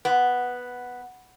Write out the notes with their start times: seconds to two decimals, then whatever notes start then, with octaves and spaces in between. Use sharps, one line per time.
0.05 B3